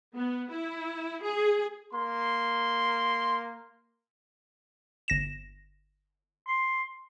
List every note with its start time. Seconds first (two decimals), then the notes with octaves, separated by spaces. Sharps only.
0.16 B3
0.51 E4
1.24 G#4
1.94 A#3 C6
5.08 G1 A#6 E7
6.47 C6